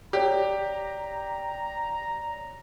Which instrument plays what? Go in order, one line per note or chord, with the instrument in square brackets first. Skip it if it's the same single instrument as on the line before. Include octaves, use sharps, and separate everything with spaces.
[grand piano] G4 [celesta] C#5 D5 [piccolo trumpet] A#5